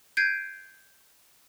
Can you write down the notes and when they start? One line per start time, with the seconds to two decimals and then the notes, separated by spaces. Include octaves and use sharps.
0.17 G6 G#6 C7 D7 D#7